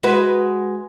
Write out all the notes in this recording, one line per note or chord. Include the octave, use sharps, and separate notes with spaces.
G#3 F#4 B4